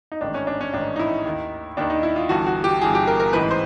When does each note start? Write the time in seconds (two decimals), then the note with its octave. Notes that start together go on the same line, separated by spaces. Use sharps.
0.12 D#4
0.21 A1 G#2 D#3 D4
0.34 C#4
0.47 D4
0.61 C#4
0.73 A1 G#2 D#3 D4
0.96 D#4
0.99 E4
1.25 D#2 D#3
1.77 D#2 D#3 D4
1.90 D#4
2.03 E4
2.16 F4
2.29 G1 G2 E3 F#4
2.46 F#4
2.64 G4
2.81 G1 G2 E3 G#4
2.95 G4
3.07 A#4
3.20 A#4
3.33 A1 G#2 E3 B4
3.51 C5